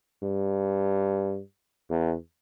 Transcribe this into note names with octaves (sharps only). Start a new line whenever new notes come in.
G2
E2